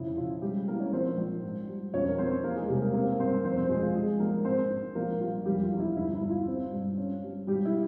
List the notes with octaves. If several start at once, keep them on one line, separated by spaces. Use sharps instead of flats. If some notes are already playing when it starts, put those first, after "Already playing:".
Already playing: F2 C#3 E4
C#3 F4
G3 G#3 G4
E3 A#3 A#4
C#4 C#5
A#1 C4 C5
A#1
G#2
G3
F2 C#4 C#5
A#4
F2 C4 C5
E2 A#3 A#4
G#3 G#4
C3 G3 G4
A#3 A#4
A#3 C4 A#4
G2 C4 C5
F1 C4 C5
C4 C5
F2 G#3 G#4
F4
F3 G#3 G#4
A#1 A#3 A#4
G#2 C4 C5
G#2
A#1 A#3 A#4
G3 F4
F1 G3 G4
F4
E2
E4
G1 E4
E4
G2
F4
C4
G2
C#4
G3
G#1 G3 G4
E4